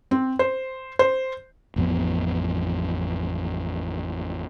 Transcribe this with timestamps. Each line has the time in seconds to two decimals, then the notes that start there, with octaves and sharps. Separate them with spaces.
0.11 C4
0.39 C5
0.99 C5
1.76 A1 F2 F3 B3